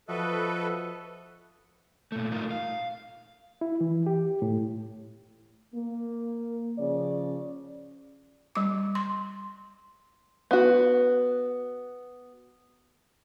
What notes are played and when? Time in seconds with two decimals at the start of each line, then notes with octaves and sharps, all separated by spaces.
0.08 F3 F#4 A4 B4 D#5 E5
2.12 A#2 A3
2.31 A3 D#4 F4 A#4
2.51 F5
3.61 E4
3.81 E3
4.06 G4
4.42 A2
5.74 A#3
6.78 C#3 F3 D5
8.55 G3 D6
8.95 C6
10.51 B3 F#4